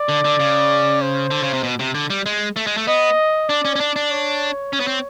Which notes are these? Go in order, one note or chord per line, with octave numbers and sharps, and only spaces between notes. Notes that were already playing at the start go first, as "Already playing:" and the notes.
Already playing: D5
D3
D3
C#3
C5
D3
C#3
C3
B2
C3
D3
G3
G#3
A3
G#3
A3
B3 D#5
D4 D5
C#4
C#4
D4
D4
C#5
C#4
B3
C4